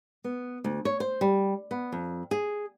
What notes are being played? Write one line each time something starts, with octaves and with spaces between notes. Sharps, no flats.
B3
D2
C#5
C5
G3
B3
F2
G#4